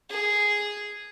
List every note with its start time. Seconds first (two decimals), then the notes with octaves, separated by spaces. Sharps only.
0.10 G#4